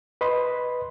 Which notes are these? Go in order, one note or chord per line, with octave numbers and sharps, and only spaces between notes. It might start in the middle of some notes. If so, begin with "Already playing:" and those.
B4 D#5 B5 C6